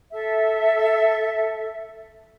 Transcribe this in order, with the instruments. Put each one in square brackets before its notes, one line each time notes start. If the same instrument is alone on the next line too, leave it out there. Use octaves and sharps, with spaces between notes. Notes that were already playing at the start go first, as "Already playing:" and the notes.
[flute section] A4 E5